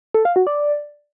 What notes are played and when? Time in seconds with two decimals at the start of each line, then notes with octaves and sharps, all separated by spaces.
0.14 A4
0.25 F5
0.36 F#4
0.47 D5